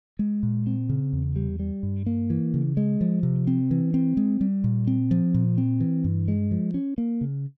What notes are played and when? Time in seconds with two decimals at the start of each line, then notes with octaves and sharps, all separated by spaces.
0.19 G#3
0.43 A#2
0.67 C4
0.89 C#3
1.13 E2
1.36 G3
1.59 G3
1.83 G2
2.06 A#3
2.30 E3
2.54 C#3
2.77 G#3
3.01 F3
3.23 C3
3.47 C4
3.71 E3
3.94 C4
4.17 G#3
4.41 G3
4.64 A#2
4.87 C4
5.11 F3
5.34 A#2
5.58 C4
5.80 E3
6.04 G2
6.28 G#3
6.51 F3
6.74 C#4
6.98 A#3
7.21 C#3